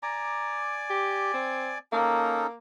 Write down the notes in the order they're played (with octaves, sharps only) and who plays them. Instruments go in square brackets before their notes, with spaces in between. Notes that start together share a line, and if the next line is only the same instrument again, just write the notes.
[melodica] D5 G#5 D6 [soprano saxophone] A#5
[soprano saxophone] G4
C4
[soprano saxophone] A#3 [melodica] C#4 D#4 A4